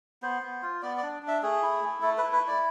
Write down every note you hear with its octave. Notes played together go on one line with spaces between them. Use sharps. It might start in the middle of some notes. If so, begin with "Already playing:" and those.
B3 C5
B3
F4
B3 D5
D5
D4
D4
E5
A3 G#4
E4
A3
A3 A4
B4
E4
B4
E4 D5